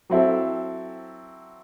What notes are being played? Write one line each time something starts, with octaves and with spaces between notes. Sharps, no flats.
F#3 C4 E4 A4